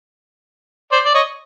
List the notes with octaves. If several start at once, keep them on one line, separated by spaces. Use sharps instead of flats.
C5 D5
D5
C#5 D#5